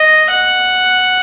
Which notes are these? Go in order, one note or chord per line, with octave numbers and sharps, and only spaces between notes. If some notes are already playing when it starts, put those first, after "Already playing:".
Already playing: D#5
F#5